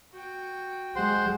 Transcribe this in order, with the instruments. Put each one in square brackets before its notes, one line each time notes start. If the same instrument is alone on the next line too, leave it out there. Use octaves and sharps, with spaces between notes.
[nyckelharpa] F#4 G5
[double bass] G#3 [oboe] C5 [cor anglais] F#5